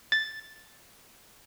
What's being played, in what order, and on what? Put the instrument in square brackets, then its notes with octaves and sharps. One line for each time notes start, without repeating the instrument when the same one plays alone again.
[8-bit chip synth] A6